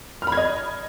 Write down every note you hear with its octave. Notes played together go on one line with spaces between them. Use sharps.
F6
B5
G#6
D#5